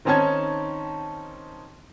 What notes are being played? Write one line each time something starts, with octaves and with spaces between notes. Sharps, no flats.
D#3 C4 C#4 D#4 A5 G#6